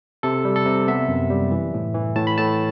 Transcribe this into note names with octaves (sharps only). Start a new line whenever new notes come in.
C3 A4
G3
A4
C3
B3 E5
F#2
G3
E3
A2
E3
A2 A5
B5
A2 A5